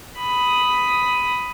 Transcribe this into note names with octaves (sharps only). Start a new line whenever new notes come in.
B5 D#6